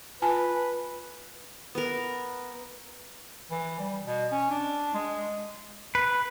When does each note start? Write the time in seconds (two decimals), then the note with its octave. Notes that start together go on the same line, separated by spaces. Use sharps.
0.22 F4 B4 G#5 A5
1.75 B3 A#4
3.51 E3
3.79 G3
4.06 B2
4.31 C#4
4.51 D4
4.94 G#3
5.95 B4